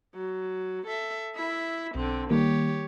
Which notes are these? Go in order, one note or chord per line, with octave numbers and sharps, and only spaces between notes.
F#3
A4 E5
E4 E5
B1 D3 C4
D#3 G3 A#3 G4 C#5